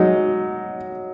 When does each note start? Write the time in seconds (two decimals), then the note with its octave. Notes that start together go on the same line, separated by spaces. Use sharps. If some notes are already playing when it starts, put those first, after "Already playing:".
Already playing: F#3 G#3 D#4